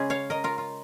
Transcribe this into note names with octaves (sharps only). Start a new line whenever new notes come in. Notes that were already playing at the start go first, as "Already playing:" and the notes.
Already playing: C#3 G#3 C#4 G#4
C#5 F5
A#4 D#5
F4 A#4
F4